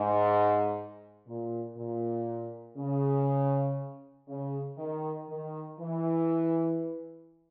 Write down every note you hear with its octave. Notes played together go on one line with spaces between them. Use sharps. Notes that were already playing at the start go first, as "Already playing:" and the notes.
Already playing: G#2
A#2
A#2
C#3
C#3
D#3
D#3
E3